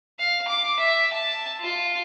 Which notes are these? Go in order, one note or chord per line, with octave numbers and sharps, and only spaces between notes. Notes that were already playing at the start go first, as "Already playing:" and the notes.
F5
D6
E5
A5
F4